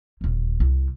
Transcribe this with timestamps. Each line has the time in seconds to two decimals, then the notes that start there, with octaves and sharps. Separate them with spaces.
0.21 D#1 D2
0.60 C2